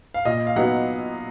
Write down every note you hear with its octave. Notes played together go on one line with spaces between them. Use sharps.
F5
A#2 D#5
F5
F#3 B3 D#4 F#5